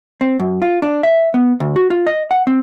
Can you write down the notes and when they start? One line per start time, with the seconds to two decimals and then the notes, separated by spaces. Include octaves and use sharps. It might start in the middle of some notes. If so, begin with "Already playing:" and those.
0.21 C4
0.40 F#2
0.62 F4
0.82 D4
1.03 E5
1.34 B3
1.60 D2
1.76 F#4
1.90 F4
2.07 D#5
2.31 F#5
2.47 C4